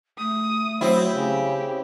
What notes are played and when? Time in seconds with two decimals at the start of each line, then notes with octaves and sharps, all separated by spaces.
0.18 A3 D#6
0.81 F#3 C4 E4
1.15 C#3 G4